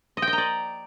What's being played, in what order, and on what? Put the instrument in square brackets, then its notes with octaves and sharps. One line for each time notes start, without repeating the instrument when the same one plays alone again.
[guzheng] D#5
G5
D#5
A#5
D5